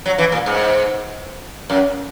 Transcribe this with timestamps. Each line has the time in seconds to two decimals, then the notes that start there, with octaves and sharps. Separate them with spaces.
0.06 F#3
0.18 E3
0.32 A#2
0.46 G#2
1.70 F#2